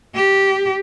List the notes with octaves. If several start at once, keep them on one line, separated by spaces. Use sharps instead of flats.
G4